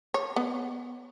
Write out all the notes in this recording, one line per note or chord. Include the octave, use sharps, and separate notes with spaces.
C#5
B3